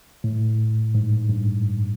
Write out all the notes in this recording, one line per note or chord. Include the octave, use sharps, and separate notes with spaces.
A2
G#2
G2